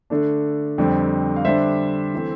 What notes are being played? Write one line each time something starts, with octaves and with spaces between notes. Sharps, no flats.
D3 A3 D4
F2 D3 G3 C4
F5
D3 G3 D4 C5 E5
E3 A3 C4